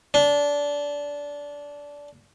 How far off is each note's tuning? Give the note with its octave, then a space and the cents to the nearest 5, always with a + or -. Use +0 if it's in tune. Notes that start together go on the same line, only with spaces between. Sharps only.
D4 -20